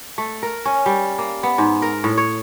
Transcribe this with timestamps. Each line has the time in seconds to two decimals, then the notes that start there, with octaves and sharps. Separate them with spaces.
0.18 A3
0.43 A#4
0.65 C#4
0.86 G3
1.18 A#3
1.43 B3
1.58 G#2
1.82 A#4
2.04 A2
2.18 C#5